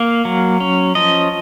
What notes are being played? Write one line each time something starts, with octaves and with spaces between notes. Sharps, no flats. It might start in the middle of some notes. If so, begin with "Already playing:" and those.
Already playing: A#3 F5
F#3
C#4
F3 D#5